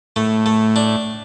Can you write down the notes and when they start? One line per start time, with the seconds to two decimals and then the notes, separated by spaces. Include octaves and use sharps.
0.16 A2 A3
0.46 A3
0.76 D4